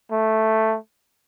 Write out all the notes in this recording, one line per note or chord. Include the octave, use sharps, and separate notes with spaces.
A3